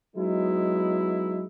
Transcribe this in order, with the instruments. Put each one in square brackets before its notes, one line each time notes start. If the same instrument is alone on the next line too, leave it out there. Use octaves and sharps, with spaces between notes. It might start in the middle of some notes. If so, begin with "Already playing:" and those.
[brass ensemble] F#3 G#3 B3 D#4 E4